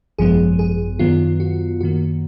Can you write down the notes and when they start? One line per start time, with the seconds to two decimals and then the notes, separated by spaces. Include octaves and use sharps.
0.18 G#1 F#2 F3 G#3 B3 G#4
0.59 G#4
0.99 F#2 D#3 F#3 B3 F4
1.40 F#4
1.81 F#2 D#3 A#3 F#4